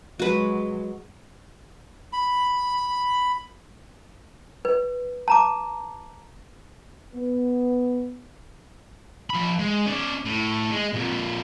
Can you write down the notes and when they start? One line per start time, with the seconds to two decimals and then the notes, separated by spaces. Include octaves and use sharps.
0.19 F#3 G#3 F#4 B4
2.13 B5
4.65 B4
5.28 A5 A#5 D6
7.14 B3
9.30 F3 B5
9.59 G#3
9.86 C#4 D5
10.25 A2
10.70 G#3
10.93 F2 A#2